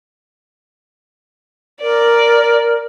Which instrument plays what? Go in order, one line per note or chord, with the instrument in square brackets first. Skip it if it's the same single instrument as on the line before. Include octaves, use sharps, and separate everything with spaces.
[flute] A#4 [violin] D5